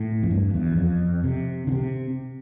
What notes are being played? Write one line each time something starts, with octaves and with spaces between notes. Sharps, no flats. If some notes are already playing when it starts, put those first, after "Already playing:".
Already playing: A2
F2
G2
E2
F2
C3
D3
C3